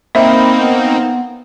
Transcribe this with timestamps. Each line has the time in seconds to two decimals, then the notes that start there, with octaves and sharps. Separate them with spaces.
0.15 A#3 C4 D#4 E5 B5
0.59 B3